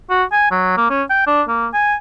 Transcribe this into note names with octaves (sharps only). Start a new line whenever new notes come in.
F#4
G#5
F#3
A#3
C#4
G5
D4
A#3
G#5